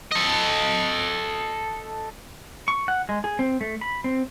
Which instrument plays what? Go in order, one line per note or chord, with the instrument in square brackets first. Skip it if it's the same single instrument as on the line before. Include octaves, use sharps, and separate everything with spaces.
[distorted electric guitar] A4 D#5
[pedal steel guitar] C#6
F#5
G#3
G#4
C4
A3
B5
C4